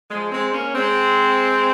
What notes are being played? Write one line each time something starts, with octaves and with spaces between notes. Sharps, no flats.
F3 G#3
G#3 C4
A#3 C#4
G#3 C4